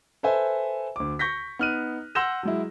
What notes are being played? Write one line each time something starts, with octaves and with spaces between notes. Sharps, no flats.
A4 B4 C5 E5 G#5
D2 D6
C#6 G6 A#6 B6
B3 D#4 F6 F#6 D#7
F#5 C6 E6 G6 A#6 E7
F#3 G#3 E4